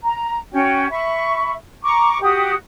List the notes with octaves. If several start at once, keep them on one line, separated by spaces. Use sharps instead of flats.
A#5
C#4 F#4 G5
E5 B5 C#6
A#5 C#6 D6
F#4 G4 D#6